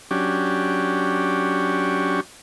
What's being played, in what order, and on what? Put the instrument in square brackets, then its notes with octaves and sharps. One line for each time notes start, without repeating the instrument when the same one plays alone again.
[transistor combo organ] F#3 C#4 D4 G4